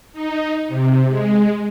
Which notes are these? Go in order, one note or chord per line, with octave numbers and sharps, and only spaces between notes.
D#4
C3
G#3